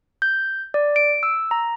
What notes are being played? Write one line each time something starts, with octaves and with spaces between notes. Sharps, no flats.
G6
D5
D7
E6
A#5